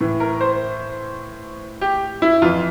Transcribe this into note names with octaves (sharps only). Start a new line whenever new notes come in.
A2 E3
A#4
C5
G4
E4
F2 E3 F4